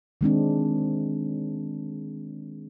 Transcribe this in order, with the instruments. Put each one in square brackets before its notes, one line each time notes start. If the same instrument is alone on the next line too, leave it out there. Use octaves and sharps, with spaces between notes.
[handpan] D#3 G#3 C4 D4